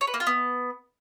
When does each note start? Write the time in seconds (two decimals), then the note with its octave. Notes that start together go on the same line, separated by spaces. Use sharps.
0.01 C#5
0.07 B4
0.14 A#3
0.20 F4
0.27 B3